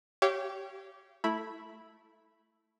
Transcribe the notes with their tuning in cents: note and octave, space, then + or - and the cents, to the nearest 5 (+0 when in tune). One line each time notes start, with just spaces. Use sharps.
G4 -20 C#5 +0 F5 -40
A3 +0 E4 +0 B5 -10